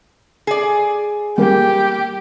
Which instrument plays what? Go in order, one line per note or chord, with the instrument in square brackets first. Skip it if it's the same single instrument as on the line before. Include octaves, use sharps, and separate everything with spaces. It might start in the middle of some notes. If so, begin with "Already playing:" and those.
[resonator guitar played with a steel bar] G#4 D5
[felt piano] G3 A#3 [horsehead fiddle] G4